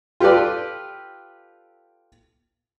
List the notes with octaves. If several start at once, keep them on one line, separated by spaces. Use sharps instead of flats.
F4 G4 A4 B4 D5